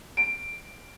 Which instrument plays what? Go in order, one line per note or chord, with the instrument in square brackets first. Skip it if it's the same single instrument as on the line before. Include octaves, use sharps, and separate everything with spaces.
[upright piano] D7